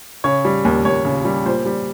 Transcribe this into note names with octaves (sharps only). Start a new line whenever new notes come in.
C#3 C#5
G3
D#2
D#2 C#5
C#3
G3
A#2 C5
G3